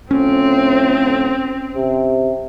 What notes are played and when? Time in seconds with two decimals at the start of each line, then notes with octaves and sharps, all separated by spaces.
0.11 A2 D3 F3 C4 C#4
1.75 C3